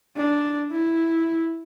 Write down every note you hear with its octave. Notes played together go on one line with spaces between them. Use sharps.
D4
E4